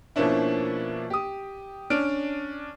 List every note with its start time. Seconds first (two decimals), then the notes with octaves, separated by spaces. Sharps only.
0.16 B2 F3 A#3 C#4 D4 E4
1.10 G4 D#6
1.90 C#4 D4 D5 F6 D7